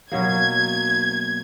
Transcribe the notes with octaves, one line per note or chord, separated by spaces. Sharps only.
B2 F#3 A#3 G#6